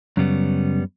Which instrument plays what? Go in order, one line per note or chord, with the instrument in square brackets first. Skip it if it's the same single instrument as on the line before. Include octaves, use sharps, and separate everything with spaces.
[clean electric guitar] F#2 C#3 G3 B3